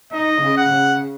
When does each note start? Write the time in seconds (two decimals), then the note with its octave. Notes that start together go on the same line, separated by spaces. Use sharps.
0.12 D#4 D#5
0.42 C#3
0.57 F#5
0.72 C#3